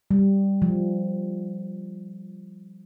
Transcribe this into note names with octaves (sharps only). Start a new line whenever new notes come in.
G3
F3